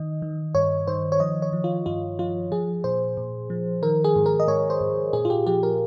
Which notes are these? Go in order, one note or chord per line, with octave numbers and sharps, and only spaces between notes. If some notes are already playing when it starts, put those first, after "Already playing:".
Already playing: D#3 D#5
D#3
G2 C#5
D#3 C5
C#5
F3 D#5
C#5
F3
F4
G2 F4
F3 F4
F3 G#4
A#2 C5
A#2
F3
D#3 A#4
G#4
G#2
A#4
D#5
G#2 C#5
C5
G#2
A#2 G#4
F4
G4
F3 G4
A#4